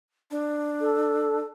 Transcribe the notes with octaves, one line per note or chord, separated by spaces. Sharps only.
D4
A4